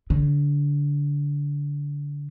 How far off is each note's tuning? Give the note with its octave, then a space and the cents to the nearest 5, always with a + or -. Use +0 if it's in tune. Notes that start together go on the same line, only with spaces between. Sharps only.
D3 -25